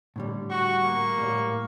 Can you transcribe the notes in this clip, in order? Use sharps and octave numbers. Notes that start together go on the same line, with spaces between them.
A2 D3 G3
F#4 C#6
A#3
A2 G3